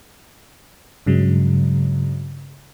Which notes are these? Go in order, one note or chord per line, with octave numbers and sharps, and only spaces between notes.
G2 C#3 F#3 G#3